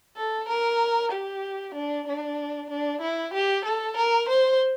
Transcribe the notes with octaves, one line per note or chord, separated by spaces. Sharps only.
A4
A#4
G4
D4
D4
D4
E4
G4
A4
A#4
C5